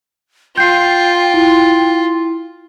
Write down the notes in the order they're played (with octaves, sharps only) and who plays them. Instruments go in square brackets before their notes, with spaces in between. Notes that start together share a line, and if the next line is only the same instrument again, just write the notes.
[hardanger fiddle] F4 [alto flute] G5 [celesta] G6 C7
[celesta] E4